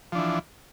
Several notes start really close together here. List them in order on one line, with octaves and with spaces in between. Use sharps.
F3 D4 E3